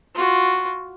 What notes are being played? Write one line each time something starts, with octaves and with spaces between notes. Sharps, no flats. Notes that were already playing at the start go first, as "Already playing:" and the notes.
F4 F#4